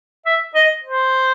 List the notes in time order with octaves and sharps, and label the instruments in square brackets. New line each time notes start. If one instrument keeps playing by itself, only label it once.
[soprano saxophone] E5
D#5
C5